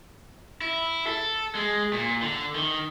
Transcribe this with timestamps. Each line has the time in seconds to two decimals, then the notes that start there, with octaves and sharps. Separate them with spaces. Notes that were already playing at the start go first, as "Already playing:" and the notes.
0.62 E4
1.07 A4
1.55 G#3
1.93 A#2
2.22 D3
2.55 D#3